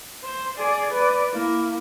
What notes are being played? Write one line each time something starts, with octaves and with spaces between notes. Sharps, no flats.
C5
G#4 D5
B4 D5
A#3 E4